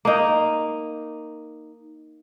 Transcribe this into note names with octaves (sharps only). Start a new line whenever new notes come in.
A#3 D#4